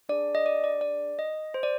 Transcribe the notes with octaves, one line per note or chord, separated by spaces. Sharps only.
D4 G#4 D5
D#5
D5
D5
D5
D#5
C5
D5